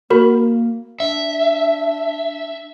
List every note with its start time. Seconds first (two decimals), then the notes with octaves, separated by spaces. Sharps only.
0.10 A#3 F#4 A#4 B5
1.00 D4 E5